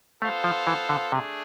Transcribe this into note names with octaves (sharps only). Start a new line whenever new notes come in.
A3 B3 F4 A4 C5 F5
F3
E3
D3
C3 A3 D4 G#4